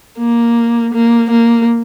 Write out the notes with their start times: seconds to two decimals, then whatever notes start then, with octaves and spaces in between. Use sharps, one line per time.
0.19 A#3
0.94 A#3
1.31 A#3